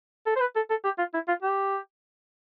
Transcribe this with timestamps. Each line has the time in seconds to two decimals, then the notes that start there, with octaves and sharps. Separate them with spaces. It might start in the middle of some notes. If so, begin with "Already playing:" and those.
0.27 A4
0.37 C5
0.41 B4
0.56 A4
0.70 A4
0.85 G4
0.99 F4
1.14 E4
1.29 F4
1.43 G4